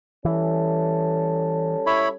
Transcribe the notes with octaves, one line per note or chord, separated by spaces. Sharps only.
E3 G3 C#4 A4
E4 C#5 B5